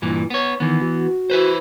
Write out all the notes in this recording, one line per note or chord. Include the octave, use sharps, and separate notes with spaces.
G2 A#2 E3
B3 C#5
D#3 E3 B3
F#4
E4 B4 C5